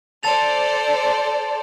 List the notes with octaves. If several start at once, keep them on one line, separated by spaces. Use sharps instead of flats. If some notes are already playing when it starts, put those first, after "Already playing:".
A4 C5 D5 A5 A6 F7